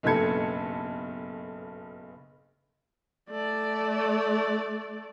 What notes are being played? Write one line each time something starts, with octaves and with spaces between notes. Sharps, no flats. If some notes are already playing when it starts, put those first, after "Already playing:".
F#1 B1 G2 A4 G#6 C#7
A3 D5